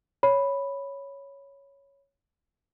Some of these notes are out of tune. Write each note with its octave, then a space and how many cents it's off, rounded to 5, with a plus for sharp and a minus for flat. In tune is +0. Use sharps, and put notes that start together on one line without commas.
C#5 +0 B5 +0